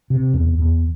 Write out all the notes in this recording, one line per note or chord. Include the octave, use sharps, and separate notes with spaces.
C3
E2
E2